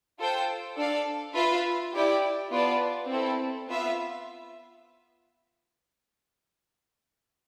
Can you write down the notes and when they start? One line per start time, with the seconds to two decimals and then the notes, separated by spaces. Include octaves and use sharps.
0.19 F4 A4 C5 G5
0.76 D4 A4 D5 F5
1.35 F4 B4 E5
1.93 E4 G4 D5 G5
2.51 B3 F4 B4 D5 A5
3.09 C4 E4 A4
3.67 B3 F4 B4 E5